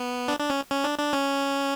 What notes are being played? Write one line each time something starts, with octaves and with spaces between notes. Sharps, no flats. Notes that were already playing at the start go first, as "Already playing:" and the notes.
Already playing: B3
D4
D4
C#4
C#4
D4
D4
C#4